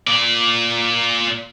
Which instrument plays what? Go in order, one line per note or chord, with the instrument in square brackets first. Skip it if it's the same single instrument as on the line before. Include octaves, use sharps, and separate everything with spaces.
[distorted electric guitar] A#2 D5